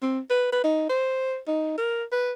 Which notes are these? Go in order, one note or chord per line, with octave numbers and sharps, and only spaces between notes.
C4
B4
B4
D#4
C5
D#4
A#4
B4